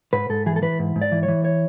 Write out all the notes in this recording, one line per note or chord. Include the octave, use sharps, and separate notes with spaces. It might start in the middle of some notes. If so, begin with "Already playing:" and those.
G#2 B4
G#2 A4
E3 G#4
A4
E3 B4
G#2
G#2
D5
E3
C#5
E3
C#5